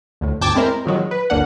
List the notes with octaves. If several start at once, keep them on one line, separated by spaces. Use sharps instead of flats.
D2 A2
G1 D2 G5 A5 D6 G#6
G#3 C4 E4 A#4 C5
A#2 D#3 F#3 G#3
B4
G1 D2 A#3 D4 F#5